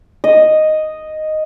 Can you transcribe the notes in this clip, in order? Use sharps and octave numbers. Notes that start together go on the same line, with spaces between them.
D#5